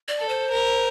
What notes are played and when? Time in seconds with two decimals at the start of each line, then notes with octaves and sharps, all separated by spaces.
0.08 D5
0.19 A4
0.29 C5
0.50 A#4